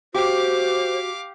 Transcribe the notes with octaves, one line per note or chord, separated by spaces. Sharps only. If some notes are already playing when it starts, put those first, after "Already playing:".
F#4 G4 C5 F5 D6